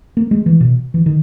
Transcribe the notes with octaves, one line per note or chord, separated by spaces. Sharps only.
A#3
G#3
E3
B2
E3
D#3